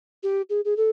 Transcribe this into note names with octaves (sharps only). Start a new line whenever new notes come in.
G4
G#4
G#4
A4